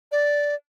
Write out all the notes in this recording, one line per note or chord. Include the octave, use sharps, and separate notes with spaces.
D5